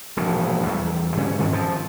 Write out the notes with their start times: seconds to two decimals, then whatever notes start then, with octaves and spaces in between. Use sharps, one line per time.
0.17 E1 A#1 G#2 F3
0.66 E2 G3
1.17 G2 D3 C#4
1.39 G2 D#3 C4
1.51 G#1 F#2 A#2 F3